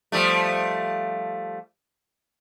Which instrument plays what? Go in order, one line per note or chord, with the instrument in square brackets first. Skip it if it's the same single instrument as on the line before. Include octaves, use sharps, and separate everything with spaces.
[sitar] F3 G3 A3